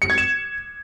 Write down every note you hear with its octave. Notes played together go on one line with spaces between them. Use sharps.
C#7
G#6
E7